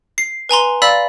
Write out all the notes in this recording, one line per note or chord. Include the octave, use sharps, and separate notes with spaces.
C7
B4 G#5 A#5 C6
D5 F5 B5 E6 A6 B6